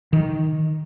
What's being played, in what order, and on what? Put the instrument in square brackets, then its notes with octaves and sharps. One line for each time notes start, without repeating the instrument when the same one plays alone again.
[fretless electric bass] D#3